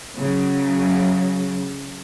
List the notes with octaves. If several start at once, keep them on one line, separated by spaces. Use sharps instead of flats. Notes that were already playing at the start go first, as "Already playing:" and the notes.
C#3 F#3